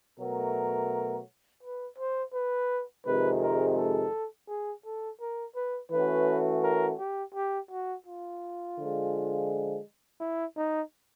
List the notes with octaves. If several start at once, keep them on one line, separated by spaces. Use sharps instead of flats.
B2 F#3 A3 A#4
B4
C5
B4
F2 C3 D#3 G#3 B4
A#4
A4
G#4
A4
A#4
B4
E3 A3 C#4 F#4 B4
A#4
G4
G4
F#4
F4
D3 F3 G#3
E4
D#4